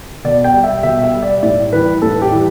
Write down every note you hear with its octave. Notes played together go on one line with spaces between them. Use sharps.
B2 D5
G5
G3
E5
B2 E5
E5
G3
D5
A2 D5
E3 G3 B4
A2 A4
G4
E3 G3